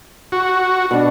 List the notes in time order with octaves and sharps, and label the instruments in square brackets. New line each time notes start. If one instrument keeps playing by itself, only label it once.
[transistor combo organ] F#4
[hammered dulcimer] B2 D4